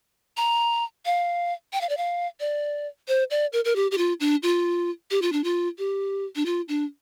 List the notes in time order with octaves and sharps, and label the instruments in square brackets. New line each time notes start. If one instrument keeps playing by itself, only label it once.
[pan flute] A#5
F5
G5
F5
D5
F5
D5
C5
D5
A#4
A#4
G4
G4
F4
D4
F4
G4
F4
D4
F4
G4
D4
F4
D4